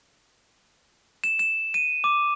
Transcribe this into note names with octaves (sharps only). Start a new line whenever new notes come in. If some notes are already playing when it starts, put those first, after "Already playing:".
E7
E7
D#7
D6